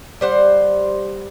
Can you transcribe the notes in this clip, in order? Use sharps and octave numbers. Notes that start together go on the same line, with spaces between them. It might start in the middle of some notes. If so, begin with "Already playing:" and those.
G3 C5 F#5